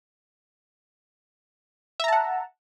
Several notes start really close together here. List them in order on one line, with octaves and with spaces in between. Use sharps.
E5 A#5 A5 F#5